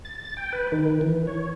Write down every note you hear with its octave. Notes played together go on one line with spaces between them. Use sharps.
A6
G5
B4
D#3
E3
C#5